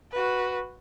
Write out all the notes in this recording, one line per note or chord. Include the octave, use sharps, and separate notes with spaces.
F#4 B4